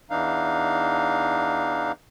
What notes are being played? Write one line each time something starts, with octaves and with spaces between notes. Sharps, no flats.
E2 E3 D4 D#4 F5